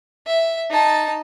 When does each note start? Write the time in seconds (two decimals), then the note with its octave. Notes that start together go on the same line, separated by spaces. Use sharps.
0.27 E5
0.70 D#4 A5